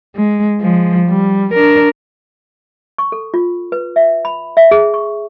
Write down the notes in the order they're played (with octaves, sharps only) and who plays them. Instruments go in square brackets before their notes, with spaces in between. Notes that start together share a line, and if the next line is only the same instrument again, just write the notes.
[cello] G#3
F3 G#3
G3
D4 A#4
[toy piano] C#6
A4
F4
B4
E5
B5
E5
G#4
C#6